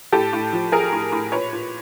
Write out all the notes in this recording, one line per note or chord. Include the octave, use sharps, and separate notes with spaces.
A2 G4 A4
A2
F3
F3 G#4 A#4
A2
A2
A#2 B4 C#5
A#2